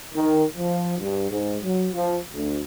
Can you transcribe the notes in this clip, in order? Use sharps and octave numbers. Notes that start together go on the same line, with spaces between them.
D#3
F3
G2
G#2
F#3
F3
D2